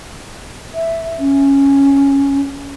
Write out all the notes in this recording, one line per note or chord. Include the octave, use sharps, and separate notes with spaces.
E5
C#4